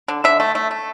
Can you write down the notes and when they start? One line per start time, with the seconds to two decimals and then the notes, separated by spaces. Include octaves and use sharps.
0.08 D3
0.24 D3 E5
0.40 A3
0.55 A3
0.71 A3